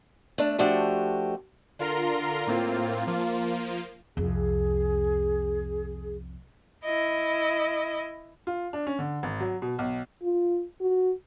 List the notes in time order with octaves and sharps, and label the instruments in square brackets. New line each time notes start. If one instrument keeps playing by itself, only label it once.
[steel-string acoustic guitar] A3 D4
F3 A3 D4 F#4 G4
[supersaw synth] D3 F4 A#4 A#5 C6
A2 A#3 C4 F4
F3 A#3 F4
[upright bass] C2 F2 [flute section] G#4
[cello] E4 D#5
[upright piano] F4
D4
C#4
D3
G#1
F#3
B2
B1
[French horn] F4
F#4